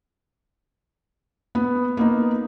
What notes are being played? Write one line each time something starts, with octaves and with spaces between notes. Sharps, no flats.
B3
A#3 B3 D#4